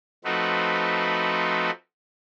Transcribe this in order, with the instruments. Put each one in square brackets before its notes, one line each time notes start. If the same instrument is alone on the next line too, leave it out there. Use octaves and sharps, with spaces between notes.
[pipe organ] F3 A3 C4 D#4 F#4 B4